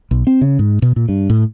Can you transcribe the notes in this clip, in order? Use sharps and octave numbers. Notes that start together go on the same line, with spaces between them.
B1
C4
C#3
G#2
B2
A#2
G2
A2